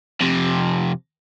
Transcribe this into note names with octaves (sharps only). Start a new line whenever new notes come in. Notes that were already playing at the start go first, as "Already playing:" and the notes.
F2 C3